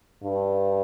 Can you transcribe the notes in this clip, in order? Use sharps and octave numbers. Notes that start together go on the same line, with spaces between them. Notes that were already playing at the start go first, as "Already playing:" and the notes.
G2